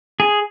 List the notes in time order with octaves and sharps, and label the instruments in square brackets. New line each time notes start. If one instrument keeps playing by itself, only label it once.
[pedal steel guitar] G#4